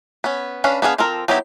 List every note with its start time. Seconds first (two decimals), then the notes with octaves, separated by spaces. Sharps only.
0.24 B3 C#4
0.64 C#4 D4 B4 F5
0.82 B3 D4 G#4 F5
0.98 F3 C4 F4 A4 A#4
1.28 F#3 B3 D#4 E4 G4